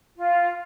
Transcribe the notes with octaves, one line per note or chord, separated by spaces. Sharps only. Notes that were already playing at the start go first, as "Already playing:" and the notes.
F4